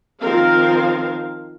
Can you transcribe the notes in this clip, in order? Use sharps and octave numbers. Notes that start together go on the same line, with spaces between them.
D#3 F3 C4 A#4 F5